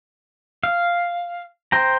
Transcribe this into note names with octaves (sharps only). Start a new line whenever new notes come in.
F5
C5 G5 A#5